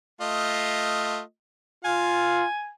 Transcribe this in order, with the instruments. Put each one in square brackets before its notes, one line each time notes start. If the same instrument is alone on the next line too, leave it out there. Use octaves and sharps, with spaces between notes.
[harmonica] A3 F4 D#5
[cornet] F4 [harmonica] F5 [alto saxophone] G#5